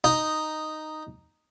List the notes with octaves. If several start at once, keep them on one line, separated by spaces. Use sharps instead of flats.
D#4